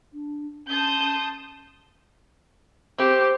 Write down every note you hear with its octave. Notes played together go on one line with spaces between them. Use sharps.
D4
C#4 A5 C6 D#6 G6
C4 G4 C5